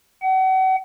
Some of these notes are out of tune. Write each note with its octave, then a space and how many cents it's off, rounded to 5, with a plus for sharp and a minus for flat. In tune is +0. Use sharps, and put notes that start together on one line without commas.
F#5 +35